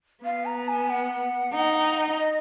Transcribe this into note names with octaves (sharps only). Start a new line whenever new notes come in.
B3 F5
A#5
G#5
F#5
D#4
D#5